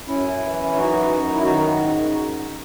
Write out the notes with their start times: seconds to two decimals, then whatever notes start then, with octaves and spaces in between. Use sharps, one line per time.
0.07 F#2 C#4 E4
0.41 E3
0.75 F#2 D#4 F#4
1.09 F#2
1.34 E4
1.43 D#3 D#4 F#4
1.76 G#2